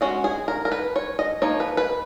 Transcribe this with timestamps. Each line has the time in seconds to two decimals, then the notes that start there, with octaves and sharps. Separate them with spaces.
0.01 G#3 C#4 F#4
0.24 G#4
0.48 A#4
0.65 A#4
0.72 B4
0.96 C#5
1.19 D#5
1.42 F3 A#3 D#4 C#5
1.60 B4
1.77 B4